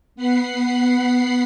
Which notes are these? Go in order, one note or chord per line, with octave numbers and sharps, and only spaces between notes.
B3 F#5 B5 C7